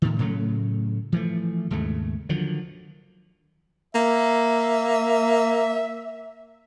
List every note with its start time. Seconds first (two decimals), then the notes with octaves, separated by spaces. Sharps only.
0.02 A2 D#3
0.19 A2 C#3 F#3 A3
1.12 E3 F3 A3
1.71 D#2 G#2 C#3 A3
2.29 D3 D#3 F3 F#3
3.95 A#3 E5